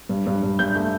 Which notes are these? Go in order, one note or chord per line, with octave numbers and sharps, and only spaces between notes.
G2
G2
G2
G2 G6
A3